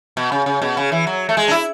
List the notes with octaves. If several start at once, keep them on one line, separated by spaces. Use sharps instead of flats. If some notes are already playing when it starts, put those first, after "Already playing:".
B2
C#3
C#3
B2
C#3
E3
F#3
A3
G#3
D4
E4